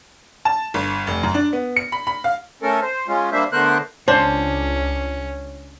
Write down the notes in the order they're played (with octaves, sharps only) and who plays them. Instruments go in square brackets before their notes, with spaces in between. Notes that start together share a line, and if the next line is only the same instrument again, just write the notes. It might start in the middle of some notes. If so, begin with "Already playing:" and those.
[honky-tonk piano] A5
G1
F1
F#2
D4
B3
C#7
B5
B5
F5
[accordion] A3 C#4 A4 A#4
C5
G#3 C#4 F4
G3 A#3 D4 C5 E5
D3 A3 B3 A#4 C5 F#6
[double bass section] C#2 [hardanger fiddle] C#4 [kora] D4 [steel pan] C5